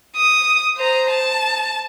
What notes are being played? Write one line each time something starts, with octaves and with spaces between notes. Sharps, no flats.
D#6
C5 A#5
A5